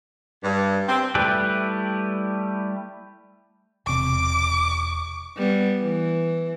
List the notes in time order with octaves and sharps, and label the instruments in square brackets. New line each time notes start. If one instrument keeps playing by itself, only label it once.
[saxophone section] G2
C4
[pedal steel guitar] G3 A3 E4 G4 B4
[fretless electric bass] E1 C3 [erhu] D6
[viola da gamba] G3 B3
E3